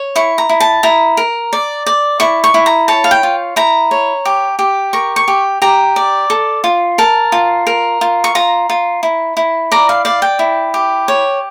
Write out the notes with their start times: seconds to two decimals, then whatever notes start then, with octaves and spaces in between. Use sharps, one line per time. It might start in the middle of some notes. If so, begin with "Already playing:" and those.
Already playing: C#5
0.16 E4 C#6
0.38 A#5
0.49 E4
0.60 A5
0.83 E4 A#5
1.17 A#4
1.53 D5
1.86 D5
2.20 E4 C#6
2.44 C#6
2.54 E4
2.66 A#5
2.88 C#5 A5
3.04 F5
3.11 G5
3.23 F4
3.56 E4 A#5
3.91 C#5
4.25 G4
4.59 G4
4.93 A#4 C#6
5.16 C#6
5.28 G4
5.62 G4 A#5
5.96 D5
6.30 A4
6.64 F4
6.98 A#4 A5
7.32 F4
7.67 A#4
8.01 F4
8.24 C#6
8.35 F4 A#5
8.70 F4
9.03 E4
9.37 E4
9.72 D5 A#5
9.89 F5
10.05 D5 F5
10.22 G5
10.39 E4
10.74 G4
11.08 C#5